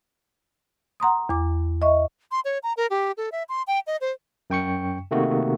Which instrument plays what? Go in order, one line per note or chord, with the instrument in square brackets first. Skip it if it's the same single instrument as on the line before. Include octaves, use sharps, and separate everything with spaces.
[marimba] F#5 A#5 C6 D#6
E2 D6
D#5 E5 C#6
[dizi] C6
C#5
A#5
A#4
G4
A4
E5
C6
G5
D#5
C5
[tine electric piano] F#2 G5 C#6 C#7
C3 D#3 A3 A#3 F#4